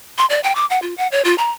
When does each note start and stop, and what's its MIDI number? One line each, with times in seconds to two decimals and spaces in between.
0.18 0.26 84
0.30 0.40 74
0.43 0.55 79
0.55 0.66 86
0.70 0.79 78
0.82 0.94 65
0.98 1.08 78
1.12 1.22 73
1.25 1.35 65
1.38 1.51 82